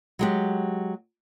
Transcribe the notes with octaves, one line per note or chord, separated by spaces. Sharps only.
F#3 G#3 G4